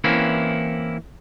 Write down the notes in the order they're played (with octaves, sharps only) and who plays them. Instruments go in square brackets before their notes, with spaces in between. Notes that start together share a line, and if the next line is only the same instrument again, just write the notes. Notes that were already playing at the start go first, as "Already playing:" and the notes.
[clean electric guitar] E3 A#3 C4 C#4 E4